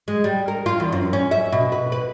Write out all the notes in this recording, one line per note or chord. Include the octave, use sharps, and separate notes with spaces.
G#3
G3
A#4
F4
E2
F#2
C#4
E5
B2
B4
B4